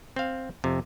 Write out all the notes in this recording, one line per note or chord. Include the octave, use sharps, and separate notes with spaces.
C4 F5
F2 C3